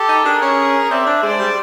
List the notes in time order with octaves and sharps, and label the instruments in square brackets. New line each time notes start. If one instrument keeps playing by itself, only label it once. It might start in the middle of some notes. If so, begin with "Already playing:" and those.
Already playing: [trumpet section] G4 A4
[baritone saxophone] D#4
[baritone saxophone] D4 [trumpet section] G#4 A#4
[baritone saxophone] C#4
[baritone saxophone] C4 [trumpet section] D5 E5
[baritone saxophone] D4
[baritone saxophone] G#3 [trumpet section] C5 D5
[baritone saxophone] G3